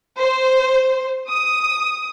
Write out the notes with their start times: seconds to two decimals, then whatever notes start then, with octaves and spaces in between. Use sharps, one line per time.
0.19 C5
1.31 D#6